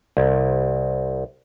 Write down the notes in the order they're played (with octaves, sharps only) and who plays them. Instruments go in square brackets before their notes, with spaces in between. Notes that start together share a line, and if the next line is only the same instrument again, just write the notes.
[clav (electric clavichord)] C2